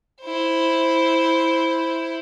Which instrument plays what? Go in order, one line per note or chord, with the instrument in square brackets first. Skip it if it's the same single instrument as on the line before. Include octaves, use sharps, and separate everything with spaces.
[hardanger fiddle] E4 C5